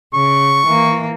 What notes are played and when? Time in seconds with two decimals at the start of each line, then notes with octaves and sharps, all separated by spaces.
0.14 C#3 C#6
0.66 E3 A#3